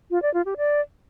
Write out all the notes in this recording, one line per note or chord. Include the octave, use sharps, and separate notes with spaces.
F4
D5
F4
G4
D5